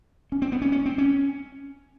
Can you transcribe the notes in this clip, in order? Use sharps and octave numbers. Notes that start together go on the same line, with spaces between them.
C#4
C4
B3
C#4
C#4
C4
C#4